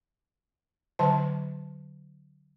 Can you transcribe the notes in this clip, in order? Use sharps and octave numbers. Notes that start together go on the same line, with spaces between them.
D3 F#3 C5 A5